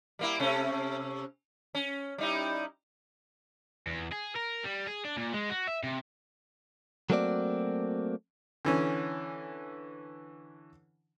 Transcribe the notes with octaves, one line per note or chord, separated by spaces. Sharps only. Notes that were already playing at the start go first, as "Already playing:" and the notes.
G3 A#3 E4
C3 A3 C#4
C#4
G3 D#4 E4
E2
G#4
A#4
G3
G#4
D4
A#2
G#3
F#4
E5
C3
F#3 A3 A#3 C4 F#4 D5
D3 E3 C#4